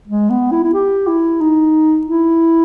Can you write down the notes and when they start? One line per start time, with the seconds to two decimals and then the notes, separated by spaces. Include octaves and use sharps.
0.07 G#3
0.30 B3
0.51 E4
0.64 E4
0.74 G4
1.07 E4
1.41 D#4
2.07 E4